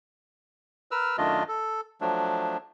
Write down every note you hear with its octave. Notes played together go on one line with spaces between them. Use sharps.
A#4 B4 E6 F6
F#2 D#3 A3 D4 F4 D#5
A4
F3 F#3 A3 D4